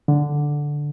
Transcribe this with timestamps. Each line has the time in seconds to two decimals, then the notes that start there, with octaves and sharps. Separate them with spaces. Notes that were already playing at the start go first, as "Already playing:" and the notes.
0.08 D3